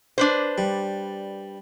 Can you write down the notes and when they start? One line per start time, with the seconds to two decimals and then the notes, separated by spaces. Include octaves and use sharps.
0.18 D4 B4 C5
0.58 G3